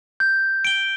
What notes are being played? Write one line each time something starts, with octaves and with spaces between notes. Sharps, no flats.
G6
D7 G7